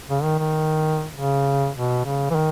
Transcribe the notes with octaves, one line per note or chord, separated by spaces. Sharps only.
C#3
D#3
D#3
C#3
B2
C#3
E3
D#3